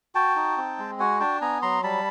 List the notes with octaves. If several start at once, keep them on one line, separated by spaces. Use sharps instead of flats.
F#4 G5 A5
D#4
C4
G#3
F#4 F#5 G#5
D4 G5 A5
B3 G#5 A#5
F#3 A#5 C6
G3 A5 B5